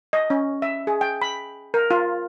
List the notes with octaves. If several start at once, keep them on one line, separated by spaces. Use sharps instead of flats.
D#5
C#4
E5
G#4
G5
B5
A#4
F4